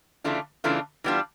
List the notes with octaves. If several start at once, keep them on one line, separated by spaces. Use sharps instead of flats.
C#3 E3 A3 D4 F4
C#3 E3 A3 D4 F4
E3 G3 B3 D4 F4